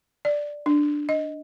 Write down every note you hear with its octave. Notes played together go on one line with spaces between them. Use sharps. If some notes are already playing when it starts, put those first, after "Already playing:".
D5
D4
D#5